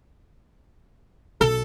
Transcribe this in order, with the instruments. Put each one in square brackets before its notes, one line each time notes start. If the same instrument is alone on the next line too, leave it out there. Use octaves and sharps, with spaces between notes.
[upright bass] B1 [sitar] A4